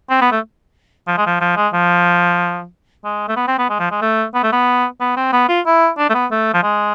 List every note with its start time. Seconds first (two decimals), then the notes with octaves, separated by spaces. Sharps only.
0.10 C4
0.21 B3
0.32 A3
1.08 F3
1.17 G#3
1.27 F3
1.41 F3
1.57 G#3
1.74 F3
3.04 G#3
3.28 A3
3.36 B3
3.48 C4
3.59 B3
3.70 G#3
3.80 F3
3.91 G#3
4.02 A3
4.35 B3
4.44 A3
4.52 B3
5.01 B3
5.17 C4
5.33 B3
5.49 F4
5.66 E4
5.98 D4
6.10 A3
6.15 B3
6.31 A3
6.54 F3
6.63 G#3